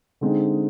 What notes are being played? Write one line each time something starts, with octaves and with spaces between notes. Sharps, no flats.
D3 G#3 C4 D#4